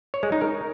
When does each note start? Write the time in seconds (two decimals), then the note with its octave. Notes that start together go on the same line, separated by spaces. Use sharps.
0.14 C#5
0.23 G#3
0.32 D#4
0.41 A#4